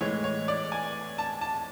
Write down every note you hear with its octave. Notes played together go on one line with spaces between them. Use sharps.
A2 E3 G#3 C#5
C#5
D5
G#5
A5
A5